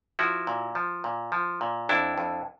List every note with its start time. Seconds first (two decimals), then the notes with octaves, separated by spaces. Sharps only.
0.19 F3 E4 F#4
0.47 A#2
0.75 F3
1.04 A#2
1.32 F3
1.61 A#2
1.89 F2 D4 E4
2.18 F2